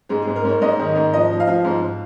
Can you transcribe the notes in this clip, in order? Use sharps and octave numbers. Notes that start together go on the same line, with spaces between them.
G#2 G#4
G#4
G#2
A#4
G#2 C#5
G#2 D#5
D#3
G#2
F3 D#5
F3
F5
F3
G#2